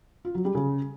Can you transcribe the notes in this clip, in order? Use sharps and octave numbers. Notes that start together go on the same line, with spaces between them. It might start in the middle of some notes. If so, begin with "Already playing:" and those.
F4
F#3
G3
C#3